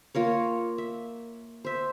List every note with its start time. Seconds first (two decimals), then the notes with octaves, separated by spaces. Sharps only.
0.15 A#3 F4 A#4 C#5
0.78 E5
1.65 C5 E5